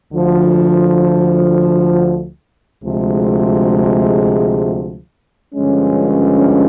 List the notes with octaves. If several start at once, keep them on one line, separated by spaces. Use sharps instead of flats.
D2 D3 F3
D2 C3 F3 G#3
G2 D3 F3 G#3 C#4